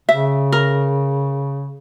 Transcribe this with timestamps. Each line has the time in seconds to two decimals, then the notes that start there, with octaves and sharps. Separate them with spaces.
0.09 C#3 E5
0.52 A#4